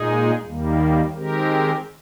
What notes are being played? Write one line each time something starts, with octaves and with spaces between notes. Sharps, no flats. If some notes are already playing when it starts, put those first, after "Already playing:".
Already playing: A#2 G#3 D#4 G#4
D#2 D#3 G3 A#3
D#3 G#3 C4 G4 A#4